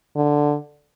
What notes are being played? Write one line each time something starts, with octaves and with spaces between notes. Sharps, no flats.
D3